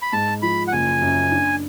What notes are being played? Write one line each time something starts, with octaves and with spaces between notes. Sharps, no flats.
B5
G#2 A5
F3 B5
F#5
F#1 G#5
F#2
D4